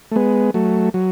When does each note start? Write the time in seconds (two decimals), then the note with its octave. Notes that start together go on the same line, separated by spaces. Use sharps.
0.11 A3
0.16 G#3 B3
0.54 F#3 A3
0.94 F#3